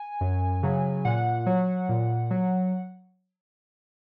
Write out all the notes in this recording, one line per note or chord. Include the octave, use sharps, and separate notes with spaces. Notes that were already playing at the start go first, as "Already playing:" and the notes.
Already playing: G#5
F#2
C#3 F#3
A#2 F#5
F#3
A#2
F#3